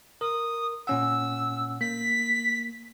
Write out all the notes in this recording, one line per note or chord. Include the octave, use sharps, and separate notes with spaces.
A#4 D#6
A#2 C#4 F#5 E6
A#3 B6